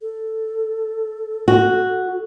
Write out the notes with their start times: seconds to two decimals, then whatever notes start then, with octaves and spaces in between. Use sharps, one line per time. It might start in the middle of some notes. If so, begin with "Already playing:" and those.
0.02 A4
1.48 F#4